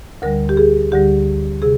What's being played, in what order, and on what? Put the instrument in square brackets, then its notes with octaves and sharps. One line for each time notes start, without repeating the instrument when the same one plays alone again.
[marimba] D2 D3 G3 A#4
G4
G#4
D2 D3 G3 G4
C3 G#4